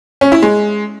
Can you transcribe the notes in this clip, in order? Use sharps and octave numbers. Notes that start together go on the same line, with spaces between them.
C#4
E4
G#3